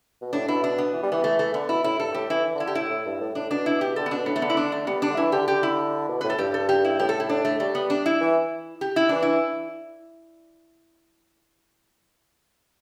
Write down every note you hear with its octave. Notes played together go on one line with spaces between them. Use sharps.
B2
A2 D4
B2 E4
D4
B3
E3
G3
E3 B3
A3
A3
D3 B3
B2 E4
A2 E4
G2 A4
A2 G4
E3 E4
E3
D3
E4
D3 G4
A2 E4
A2
G2
A2
A2 D4
B2 D4
E4
G4
D3 A4
B3
B2 D4
A2 B3
A3
D3 B3
E4
D4
A3
G3 B3
D4
D3
E3 E4
D3 G4
G4
E4
B2
A2 B4
A4
G2 G4
A4
G4
E4
A2 G4
A4
E4
A2 D4
A2 A3
G3 A3
B3
D4
E4
E3
G4
E4
E3 D4
E4